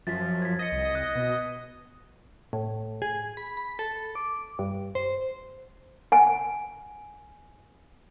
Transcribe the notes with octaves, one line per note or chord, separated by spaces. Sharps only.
F#2 F3 A6 B6
G#6 B6
D#5 A#6 B6 C#7
C2
D#6 F#6
B2
A2
G#4
B5
B5
A4
D6
G2
C5
F#5 G#5